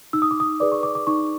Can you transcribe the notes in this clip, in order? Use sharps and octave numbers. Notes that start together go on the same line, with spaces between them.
D#4 E6
D#6
D6
D#6
G#4 B4 D5 D6
C#6
D6
D6
D#4 C#6